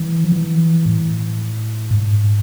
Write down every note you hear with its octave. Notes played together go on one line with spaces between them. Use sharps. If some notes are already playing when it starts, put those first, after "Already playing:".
Already playing: E3
F3
E3
A2
G#2